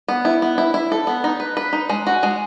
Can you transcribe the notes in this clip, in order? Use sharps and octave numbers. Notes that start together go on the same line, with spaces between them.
B3
E4
B3
E4
E4
A4
B3
D#4
B4
B4
D#4
G#3
F#4
G#3